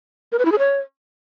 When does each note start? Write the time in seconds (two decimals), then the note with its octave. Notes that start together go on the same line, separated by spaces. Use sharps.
0.32 A#4
0.39 B4
0.45 E4
0.52 G#4
0.59 C#5